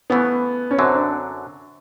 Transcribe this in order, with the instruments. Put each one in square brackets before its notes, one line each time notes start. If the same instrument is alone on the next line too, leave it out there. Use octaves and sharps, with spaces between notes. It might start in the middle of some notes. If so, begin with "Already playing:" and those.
[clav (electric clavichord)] C#3 E3 A3 [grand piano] B3
[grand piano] C#4
[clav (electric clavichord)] F#2 D3 F#3 [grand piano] C4
[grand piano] D4